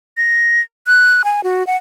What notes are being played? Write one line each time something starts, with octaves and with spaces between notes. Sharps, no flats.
A#6
F#6
G#5
F#4
F#5